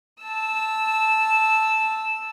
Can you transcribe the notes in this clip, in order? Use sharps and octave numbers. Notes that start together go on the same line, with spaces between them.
A5 E6